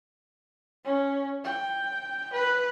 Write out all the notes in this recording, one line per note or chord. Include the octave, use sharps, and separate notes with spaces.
C#4
G5
B4